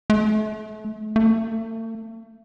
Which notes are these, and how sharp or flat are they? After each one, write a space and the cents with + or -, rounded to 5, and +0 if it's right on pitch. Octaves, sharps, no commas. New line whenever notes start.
A3 -35
A3 +40